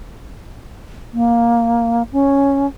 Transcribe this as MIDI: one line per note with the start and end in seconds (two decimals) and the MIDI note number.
1.13 2.02 58
2.12 2.66 61